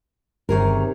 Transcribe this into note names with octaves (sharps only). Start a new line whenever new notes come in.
G1 C3 D#3 G#4 A#4 C#5